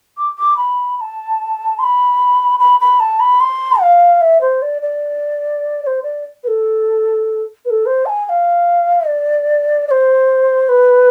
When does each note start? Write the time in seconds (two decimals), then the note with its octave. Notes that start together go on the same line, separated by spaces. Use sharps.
0.17 D6
0.38 D6
0.57 B5
0.97 B5
1.01 A5
1.79 C6
1.83 B5
2.60 B5
2.80 B5
3.00 A5
3.20 B5
3.40 C6
3.81 F5
4.21 E5
4.41 C5
4.62 D5
4.82 D5
5.83 D5
5.87 C5
6.03 D5
6.44 B4
6.48 A4
7.65 B4
7.70 A4
7.86 C5
8.06 A5
8.09 G#5
8.26 G#5
8.29 F5
9.07 D5
9.88 D5
9.91 C5
10.69 B4